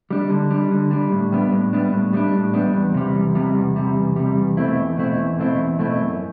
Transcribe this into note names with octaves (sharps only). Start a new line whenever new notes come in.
G3 D4
D3
G3 D4
D3
G3 D4
A2
G3 B3 D4
A2
G3 B3 D4
A2
G3 B3 D4
A2
G3 B3 D4
E2
C3 G3
E2
C3 G3
E2
C3 G3
E2
C3 G3
E2
B2 A3 C4 E4
E2
B2 A3 C4 E4
E2
B2 A3 C4 E4
E2
B2 A3 C4 E4
F#2